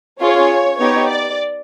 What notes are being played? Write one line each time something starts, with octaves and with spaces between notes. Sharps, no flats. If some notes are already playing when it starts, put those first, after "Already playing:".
C#4 F4 G#4 C#5
B3 D#4 G4 C#5
D5